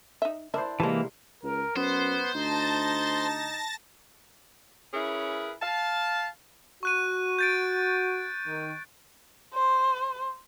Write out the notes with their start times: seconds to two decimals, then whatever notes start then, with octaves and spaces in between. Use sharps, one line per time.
0.22 D#4 E5
0.54 D4 E4 A#4 C5 E5
0.80 C3 E3 F3 G#3 A#3 A5
1.43 C#2 A#4
1.76 F#2 B3 C5
2.34 D2 D#4 A5 A6 A#6
4.94 C#4 E4 G#4 A#4 B4
5.62 F5 A5
6.83 F#4 C#6 F#6 D#7
7.39 G6 A6 D7
8.47 D#3
9.54 C5